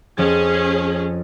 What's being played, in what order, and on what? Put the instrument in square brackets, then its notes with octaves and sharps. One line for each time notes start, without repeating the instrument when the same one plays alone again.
[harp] F2 F3 G#6 [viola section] C#4 G#4